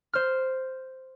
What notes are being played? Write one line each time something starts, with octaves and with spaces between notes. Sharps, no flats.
C5 F6